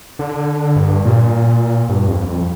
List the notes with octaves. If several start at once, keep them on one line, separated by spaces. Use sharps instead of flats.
D3
G2
A#2
G2
F2
F2